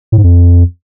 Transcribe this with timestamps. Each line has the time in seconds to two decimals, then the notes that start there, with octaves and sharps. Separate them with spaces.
0.12 A2
0.18 G#2
0.24 F2